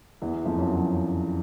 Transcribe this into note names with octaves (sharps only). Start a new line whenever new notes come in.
E2 E3
F2 F3
F#2 F#3